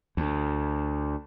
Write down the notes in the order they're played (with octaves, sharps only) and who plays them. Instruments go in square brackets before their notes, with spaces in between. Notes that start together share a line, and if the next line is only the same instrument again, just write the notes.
[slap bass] D2